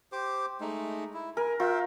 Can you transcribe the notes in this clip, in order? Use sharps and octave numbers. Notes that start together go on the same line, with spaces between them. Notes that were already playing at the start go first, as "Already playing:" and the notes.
G4 C5 D6
G#3 A3 D#4
E4
A#4 G#5
F4 E5 G5